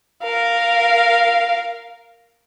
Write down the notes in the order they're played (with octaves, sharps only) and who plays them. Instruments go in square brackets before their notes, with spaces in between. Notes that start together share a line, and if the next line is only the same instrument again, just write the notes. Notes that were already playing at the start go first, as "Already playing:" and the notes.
[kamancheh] A#4 F5